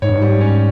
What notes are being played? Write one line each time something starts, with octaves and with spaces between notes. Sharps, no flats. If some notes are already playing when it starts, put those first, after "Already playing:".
G#2 C#5
G2
G#2 G3
C#4